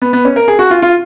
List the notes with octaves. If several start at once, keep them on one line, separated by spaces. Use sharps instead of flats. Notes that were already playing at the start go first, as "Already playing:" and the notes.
B3
B3
C#4
A#4
G#4
F#4
F4
F4